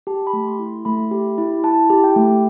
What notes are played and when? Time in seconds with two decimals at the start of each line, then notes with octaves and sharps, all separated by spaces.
0.07 G4 A5
0.27 B5
0.33 A3
0.47 C6
0.59 E4
0.66 C6
0.85 A3 B5
1.11 G4
1.38 E4
1.64 E4 A5
1.90 G4
2.04 G5
2.16 A3